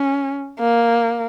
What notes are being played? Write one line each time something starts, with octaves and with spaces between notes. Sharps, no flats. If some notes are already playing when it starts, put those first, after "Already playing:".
Already playing: C#4
A#3